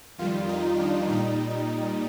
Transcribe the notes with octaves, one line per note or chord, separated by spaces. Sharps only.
F2 D#3 G3 F4
D#4
D4
A#2 G3 D#4